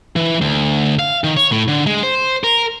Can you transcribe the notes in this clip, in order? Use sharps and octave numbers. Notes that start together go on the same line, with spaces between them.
E3
D2
F5
D#3
C#5
A2
D3
G#3
C5
A#4